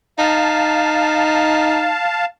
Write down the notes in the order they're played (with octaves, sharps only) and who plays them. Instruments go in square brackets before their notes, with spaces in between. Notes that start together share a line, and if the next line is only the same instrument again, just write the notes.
[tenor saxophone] D#4 [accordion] F5 A5